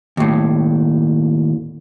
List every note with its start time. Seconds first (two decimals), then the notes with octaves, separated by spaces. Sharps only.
0.17 D#2 A2